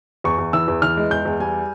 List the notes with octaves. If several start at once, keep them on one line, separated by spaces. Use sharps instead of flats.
E2 C#6
E2
E3 E6
E2
E3 F6
G#3
E2 G6
E2
G3 G#5